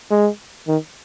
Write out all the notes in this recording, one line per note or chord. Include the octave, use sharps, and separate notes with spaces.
G#3
D#3